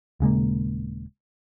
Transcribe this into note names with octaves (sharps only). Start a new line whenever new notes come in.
D#1 C#3 G#3 A#3